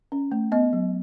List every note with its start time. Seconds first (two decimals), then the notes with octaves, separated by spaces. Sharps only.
0.12 C#4
0.32 A3
0.52 B3 D#5
0.73 F#3